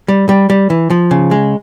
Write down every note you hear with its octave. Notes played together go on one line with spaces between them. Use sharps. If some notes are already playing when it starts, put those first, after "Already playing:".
G3
G3
G3
E3
F3
C#3
G#3